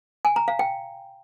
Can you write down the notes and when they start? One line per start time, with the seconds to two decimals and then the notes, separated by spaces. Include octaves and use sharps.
0.25 G#5
0.36 A#5
0.48 F5
0.59 G5